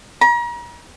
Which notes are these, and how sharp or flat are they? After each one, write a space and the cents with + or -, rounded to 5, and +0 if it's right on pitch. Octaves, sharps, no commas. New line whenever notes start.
A#5 +40